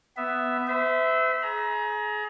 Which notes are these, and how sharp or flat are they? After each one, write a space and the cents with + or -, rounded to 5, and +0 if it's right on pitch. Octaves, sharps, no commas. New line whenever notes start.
B3 +10 E5 +0
C5 -45 E5 -10
G#4 +30 A#5 +25